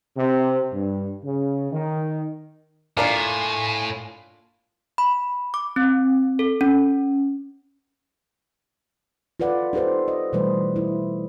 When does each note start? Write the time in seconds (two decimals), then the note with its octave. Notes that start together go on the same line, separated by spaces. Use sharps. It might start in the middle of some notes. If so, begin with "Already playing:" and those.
0.16 C3
0.72 G2
1.24 C#3
1.71 D#3
2.97 A2 A#3 D4 F4 G#5
4.98 B5
5.54 D6
5.76 C4
6.39 A4
6.61 C#4
9.40 F4 A4 B4 D5 F#5
9.73 D#4 G4 A4 B4 C5
10.08 D#5
10.33 B2 E3 G3 A3 B4 C5
10.76 E4